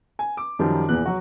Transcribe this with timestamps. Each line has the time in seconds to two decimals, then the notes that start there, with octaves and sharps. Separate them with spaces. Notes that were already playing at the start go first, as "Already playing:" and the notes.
0.19 G#5
0.37 D6
0.59 F#2 D#3 F3 G3
0.89 E2 A#2 E3 F#6
1.06 F#3 F#4